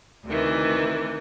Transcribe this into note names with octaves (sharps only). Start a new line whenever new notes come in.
D2 C3 D#3 E3